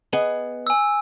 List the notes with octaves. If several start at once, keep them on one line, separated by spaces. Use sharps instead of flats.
B3 G#4 D#5
G#5 E6